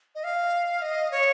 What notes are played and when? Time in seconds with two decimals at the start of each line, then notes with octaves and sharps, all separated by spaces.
0.15 D#5
0.24 F5
0.82 D#5
1.11 C#5